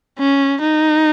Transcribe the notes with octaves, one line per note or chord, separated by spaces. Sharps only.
C#4
D#4